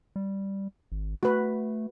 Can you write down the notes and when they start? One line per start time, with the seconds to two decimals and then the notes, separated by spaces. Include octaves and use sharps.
0.16 G3
0.92 G#1
1.23 A3 F#4 B4